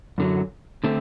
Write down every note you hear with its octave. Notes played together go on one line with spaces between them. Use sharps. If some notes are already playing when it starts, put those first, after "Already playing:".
F#2 D3 F#3
D3 A3 C4